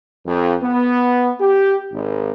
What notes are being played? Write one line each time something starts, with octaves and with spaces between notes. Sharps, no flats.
F2
B3
G4
G#1